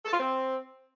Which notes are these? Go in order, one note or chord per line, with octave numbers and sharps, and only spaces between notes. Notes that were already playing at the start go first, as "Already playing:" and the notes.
A4
F4
C4